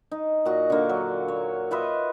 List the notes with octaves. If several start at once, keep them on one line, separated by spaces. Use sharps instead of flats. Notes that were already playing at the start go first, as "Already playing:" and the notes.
D#4
A#2 F#4 D#5
D3 A#3
F#3
C#5
F4 B4 D#5 E5